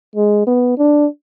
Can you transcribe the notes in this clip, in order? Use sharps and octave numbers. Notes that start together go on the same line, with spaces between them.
G#3
B3
D4